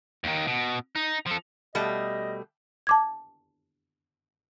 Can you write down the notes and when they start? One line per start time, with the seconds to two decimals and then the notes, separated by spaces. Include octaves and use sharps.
0.24 D#2 D#3
0.47 B2
0.95 D#4
1.27 F3 A4
1.75 B2 G3 A3 D#5
2.87 A5 D6 G#6